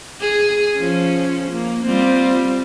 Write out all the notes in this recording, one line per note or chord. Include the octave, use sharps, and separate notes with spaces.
G#4
F3 C#4
A#3
G3 C4 F4